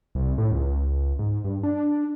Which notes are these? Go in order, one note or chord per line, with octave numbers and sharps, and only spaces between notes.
C2
A2
C#2
G#2
G2
D4